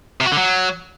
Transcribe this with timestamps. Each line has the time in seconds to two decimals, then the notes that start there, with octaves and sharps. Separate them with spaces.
0.21 C3
0.26 F#4
0.32 D3
0.38 F#3